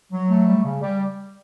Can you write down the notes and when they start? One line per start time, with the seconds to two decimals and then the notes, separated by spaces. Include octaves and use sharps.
0.11 F#3
0.29 A3
0.47 G3
0.65 C#3
0.82 G3